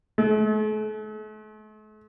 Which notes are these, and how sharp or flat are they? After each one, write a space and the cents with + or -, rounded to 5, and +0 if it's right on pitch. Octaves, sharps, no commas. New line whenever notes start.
A3 -45